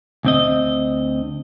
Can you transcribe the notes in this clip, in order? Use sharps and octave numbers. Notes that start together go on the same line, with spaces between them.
D2 C4 D#5